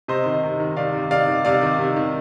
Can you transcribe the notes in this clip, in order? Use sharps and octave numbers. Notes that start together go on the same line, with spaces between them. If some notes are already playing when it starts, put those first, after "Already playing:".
C3 C5 D#5
D#3
C3
D#3
C3 D5 F5
D#3
C3 D5 F5
D#3
C3 D5 F5
D#3
C3
D#3